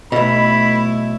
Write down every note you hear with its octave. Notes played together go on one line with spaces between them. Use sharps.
B1 B2 A3 E4 B5